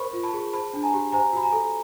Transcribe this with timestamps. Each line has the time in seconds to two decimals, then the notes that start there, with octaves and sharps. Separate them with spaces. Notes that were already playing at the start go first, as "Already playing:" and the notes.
Already playing: A#4 C5 B5 C#6
0.13 F4
0.23 A5 B5
0.33 G#4
0.53 C5 A5 B5
0.73 D4
0.83 G#5 A#5
0.94 G4
1.12 C5 G#5 A#5
1.33 F#4 B5
1.43 G#5 A#5
1.53 A4